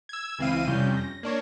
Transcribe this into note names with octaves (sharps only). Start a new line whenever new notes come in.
E6 G#6
C#2 E3 C4 E4 F5 D#7
F2 C3 G3 C#4 G6
A#6
A#3 D4 C#5